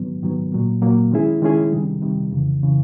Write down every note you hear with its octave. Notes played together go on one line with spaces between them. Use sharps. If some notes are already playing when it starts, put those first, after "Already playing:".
Already playing: G#2 D#3 F#3 B3
G#2 D#3 F#3 B3
A#2 F#3 A#3
A#2 F#3 A#3
D#3 G#3 C#4 E4 G#4
D#3 G#3 C#4 E4 G#4
C3 D#3 G3
C3 D#3 G3
F2 C#3 E3
C#3 E3